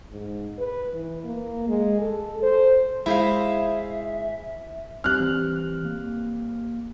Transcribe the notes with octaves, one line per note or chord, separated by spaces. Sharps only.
G#2
B4
E3
A#3
G#3
A4
C5
G#3 E4 G#4 C5 E5 F5
G3 C4 F6 F#6
E3
A#3